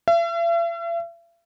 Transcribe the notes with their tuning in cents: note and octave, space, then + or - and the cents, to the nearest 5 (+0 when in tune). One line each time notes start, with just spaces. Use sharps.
E5 +45